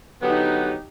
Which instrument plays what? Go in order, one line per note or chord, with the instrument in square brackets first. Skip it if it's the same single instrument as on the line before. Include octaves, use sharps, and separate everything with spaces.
[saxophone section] D3 F#3 B3 [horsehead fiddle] D#4 G4